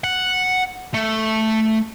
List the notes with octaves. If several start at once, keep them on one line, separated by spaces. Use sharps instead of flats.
F#5
A3